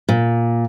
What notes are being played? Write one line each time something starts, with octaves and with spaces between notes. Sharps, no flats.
A#2